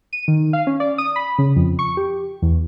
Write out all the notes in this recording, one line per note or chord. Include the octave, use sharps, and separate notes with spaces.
D#7
D#3
F5
C#4
D5
D#6
B5
C#3
F2
C#6
G4
E2